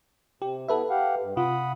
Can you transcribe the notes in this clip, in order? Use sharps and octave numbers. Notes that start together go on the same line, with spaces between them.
C3 G4
B3 E4 A4 B4 E5
G4 F5 F#5
G2
C3 F4 F#5 B5 D#6